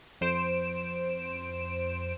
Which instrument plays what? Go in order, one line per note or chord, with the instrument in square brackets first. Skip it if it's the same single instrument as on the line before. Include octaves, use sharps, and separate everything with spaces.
[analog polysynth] F2 C5 D7 E7